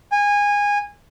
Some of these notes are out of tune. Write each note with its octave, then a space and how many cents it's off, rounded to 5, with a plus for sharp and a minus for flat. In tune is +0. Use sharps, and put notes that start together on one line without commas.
G#5 -20